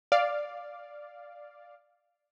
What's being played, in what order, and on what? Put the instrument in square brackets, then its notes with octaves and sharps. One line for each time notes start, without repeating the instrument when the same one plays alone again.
[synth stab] D5 F5